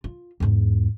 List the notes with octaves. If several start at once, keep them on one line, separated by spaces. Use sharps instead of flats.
F4
E2 G#2